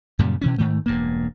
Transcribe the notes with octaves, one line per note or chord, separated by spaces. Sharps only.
F#2 A#2 C#3 G3
B2 E3 C#4
G#2 D#3 A3
E1 G2 A#3